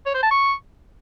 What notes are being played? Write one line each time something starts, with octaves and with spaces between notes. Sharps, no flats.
C#5
C5
A5
C#6